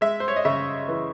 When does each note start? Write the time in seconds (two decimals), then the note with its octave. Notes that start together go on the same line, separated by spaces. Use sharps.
0.01 G#3 E5
0.20 C5
0.28 C#5
0.36 D#5
0.45 C#3 E5
0.88 E3